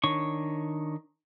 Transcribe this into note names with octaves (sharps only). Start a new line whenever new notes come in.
D#3 D4 C#5 C#6